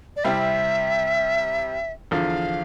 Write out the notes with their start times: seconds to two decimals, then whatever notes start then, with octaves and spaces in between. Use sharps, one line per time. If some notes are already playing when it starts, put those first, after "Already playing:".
0.16 D5
0.24 C3 G3 C4 E4 E5 F5
2.11 E2 D3 F3 F5